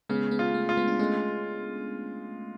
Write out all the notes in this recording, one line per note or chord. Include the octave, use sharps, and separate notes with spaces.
C#3 G#3 B3
G#3 B3
F4
A3
F4
G#3 B3
D4
G#3 A3 C#4